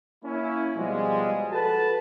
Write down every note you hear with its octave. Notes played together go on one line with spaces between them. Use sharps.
A#3 C#4 E4
B2 F3 G3 G#3
F#4 A4 B4 A5